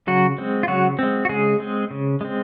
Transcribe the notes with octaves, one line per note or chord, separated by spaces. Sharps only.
C#3 F#3 F#4
G#3 C4
F4
C#3 F#3 F#4
G#3 C4
F#4
C#3 G#3 G#4
G#3 C4
C#3
G#3 C4